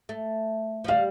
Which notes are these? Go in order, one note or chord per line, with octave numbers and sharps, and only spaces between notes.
A3
F3
G3 F5